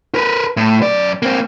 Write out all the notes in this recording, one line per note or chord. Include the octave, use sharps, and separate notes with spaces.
A#4 B4
A2
F#2 D5
A#3 C4